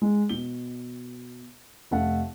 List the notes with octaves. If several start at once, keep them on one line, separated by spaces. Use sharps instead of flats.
G#3
B2 G7
F1 A3 F5 F#5 A5